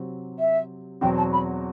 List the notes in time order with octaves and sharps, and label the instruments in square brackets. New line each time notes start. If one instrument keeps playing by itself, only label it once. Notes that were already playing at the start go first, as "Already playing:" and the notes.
Already playing: [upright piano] C3 F#3 C4
[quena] E5
[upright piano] E2 B2 F#3 C4 F#4 [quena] G5
[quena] A5
B5